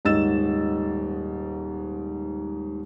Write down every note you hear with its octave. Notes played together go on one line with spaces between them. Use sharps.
D#1 G#2 D#5 E6 A6 E7